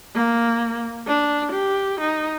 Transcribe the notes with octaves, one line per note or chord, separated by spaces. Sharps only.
A#3
D4
G4
D#4